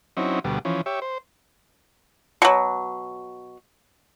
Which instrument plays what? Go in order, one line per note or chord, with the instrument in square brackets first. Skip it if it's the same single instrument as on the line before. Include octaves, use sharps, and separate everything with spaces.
[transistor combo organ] F#3 C4 C#4 D#4 E4
D2 B2 G3
E3 F3 C#4
G4 C#5 E5
C5
[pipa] B2 F#3